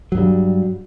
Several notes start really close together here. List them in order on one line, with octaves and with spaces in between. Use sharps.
F#3 G2 G3